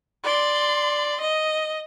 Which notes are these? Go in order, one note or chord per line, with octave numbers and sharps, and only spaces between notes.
D5 C6
D#5